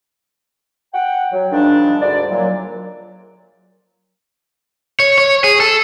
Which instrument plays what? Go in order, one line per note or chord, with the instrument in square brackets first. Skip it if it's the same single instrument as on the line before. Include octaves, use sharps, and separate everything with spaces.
[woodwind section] F#5 G5
F#3
G#2 D#3 F3 G3 D4
D2 G#2 D3 G3 D5
A#2 F#3
[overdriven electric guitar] C#5
C#5
G#4
A4